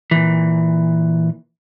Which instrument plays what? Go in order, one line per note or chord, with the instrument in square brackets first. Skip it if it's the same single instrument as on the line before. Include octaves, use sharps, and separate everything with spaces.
[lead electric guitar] A#2 E3